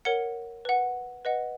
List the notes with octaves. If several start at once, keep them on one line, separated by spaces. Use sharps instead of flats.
A#4 C#5 F#5 C#7
B4 F#5
B4 D#5 F#5